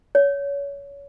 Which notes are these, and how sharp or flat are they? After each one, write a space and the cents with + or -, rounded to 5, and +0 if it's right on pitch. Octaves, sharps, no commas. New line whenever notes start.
C#5 +25